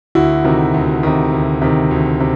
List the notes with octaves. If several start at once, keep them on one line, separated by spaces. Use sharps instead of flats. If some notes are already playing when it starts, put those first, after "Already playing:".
D2 E4 F#4
C3 D#3
D2
C3 D#3
D2
C3 D#3
D2
C3